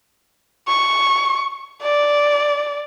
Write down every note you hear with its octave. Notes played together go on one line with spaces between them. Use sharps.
C#6
D5